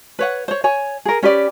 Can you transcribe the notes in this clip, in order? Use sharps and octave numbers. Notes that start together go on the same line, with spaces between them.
B4 C#5 F#5
C5 C#5
C#5 G#5
G#4 A#4
C#4 G4 B4 D5